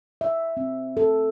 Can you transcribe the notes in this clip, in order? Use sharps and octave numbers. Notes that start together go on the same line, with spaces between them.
E5
C4
A4